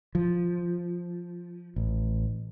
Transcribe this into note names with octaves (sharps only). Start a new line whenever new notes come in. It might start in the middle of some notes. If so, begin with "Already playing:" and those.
F3
A1